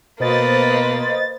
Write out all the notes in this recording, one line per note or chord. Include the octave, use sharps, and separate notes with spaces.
B2 A#3 B4 C5 D#5 A6